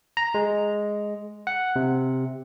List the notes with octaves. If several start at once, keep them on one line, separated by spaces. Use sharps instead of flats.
A#5
G#3
F#5
C3